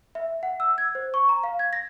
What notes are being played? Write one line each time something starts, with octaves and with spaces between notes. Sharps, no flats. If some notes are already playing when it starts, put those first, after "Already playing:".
E5
F#5
E6
G#6
C5
C#6
A#5
F5
G#6
A#6